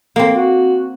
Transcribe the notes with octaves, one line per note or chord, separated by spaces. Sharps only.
A#3 C4
F#4